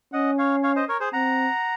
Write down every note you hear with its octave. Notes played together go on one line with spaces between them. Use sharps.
C#4 D#5 F#5
C#5 F5
C#5 F5
C5 D#5
A#4 C#5
G#4 C5
C4 F#5 A#5